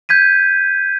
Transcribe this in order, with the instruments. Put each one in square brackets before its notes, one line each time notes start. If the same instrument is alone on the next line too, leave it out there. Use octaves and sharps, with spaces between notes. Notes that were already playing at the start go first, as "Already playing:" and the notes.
[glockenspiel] G6 G#6 B6 D#7